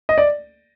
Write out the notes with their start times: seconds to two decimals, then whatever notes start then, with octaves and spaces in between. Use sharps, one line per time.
0.09 D#5
0.18 D5